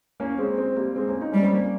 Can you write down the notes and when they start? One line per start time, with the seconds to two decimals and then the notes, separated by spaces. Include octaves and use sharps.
0.20 A#3 C#4
0.38 G#3 C4
0.57 G#3 C4
0.76 G3 A#3
0.96 G#3 C4
1.09 A#3 C#4
1.21 D#4
1.32 G3 C#4
1.43 C4
1.53 A#3 C#4